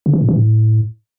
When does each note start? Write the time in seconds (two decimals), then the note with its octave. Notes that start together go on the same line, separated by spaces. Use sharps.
0.06 C#3
0.13 E3
0.21 A#2
0.29 E3
0.36 A2